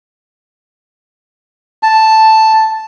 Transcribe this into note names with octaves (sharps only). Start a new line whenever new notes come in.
A5